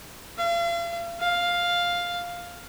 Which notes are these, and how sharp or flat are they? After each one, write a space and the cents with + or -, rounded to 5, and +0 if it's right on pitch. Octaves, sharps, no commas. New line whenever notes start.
F5 -40
F5 +5